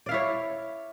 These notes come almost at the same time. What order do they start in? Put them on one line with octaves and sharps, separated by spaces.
D5 F5 E4 C#5